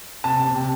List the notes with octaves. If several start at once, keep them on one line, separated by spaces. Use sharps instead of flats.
C3 A5
C3
C3